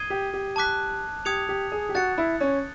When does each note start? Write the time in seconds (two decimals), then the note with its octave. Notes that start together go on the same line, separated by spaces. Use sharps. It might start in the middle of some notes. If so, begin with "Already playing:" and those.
Already playing: D#6 G#6 C7 D#7 G7
0.10 G4
0.33 G4
0.56 A5 D6 F#6 B6
1.25 G4 D#6 G#6 C#7 F7
1.49 G4
1.72 G#4
1.89 G4
1.95 F#4 F#6 A6 C#7
2.18 E4
2.41 C#4